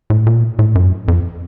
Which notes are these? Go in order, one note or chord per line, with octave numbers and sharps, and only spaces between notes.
A2
A#2
A2
F#2
F2